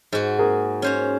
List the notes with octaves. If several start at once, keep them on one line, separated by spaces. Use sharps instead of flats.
G#2 F#4
A#3 G#4 A#4
C#4 C5 A#5